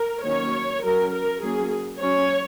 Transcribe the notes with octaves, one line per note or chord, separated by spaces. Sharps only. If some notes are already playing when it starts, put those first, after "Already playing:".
Already playing: A#4
D#3 F#3 A#3 C#4 C#5
F#3 C#4 A#4
A#4
F#3 A#3 C#4 G#4
F#3 C#4 C#5